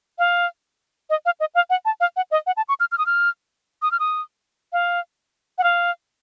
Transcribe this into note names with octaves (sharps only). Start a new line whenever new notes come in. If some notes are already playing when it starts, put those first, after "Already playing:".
F5
D#5
F5
D#5
F5
F#5
A5
F5
F#5
D#5
F#5
A5
C#6
F6
F6
D#6
F6
D#6
F6
D#6
F5
F#5
F5